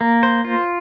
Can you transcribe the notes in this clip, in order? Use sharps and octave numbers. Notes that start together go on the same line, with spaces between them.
A#3
C5
F4